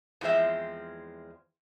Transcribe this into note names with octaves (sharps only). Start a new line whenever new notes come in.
E2 F3 G#3 C4 E5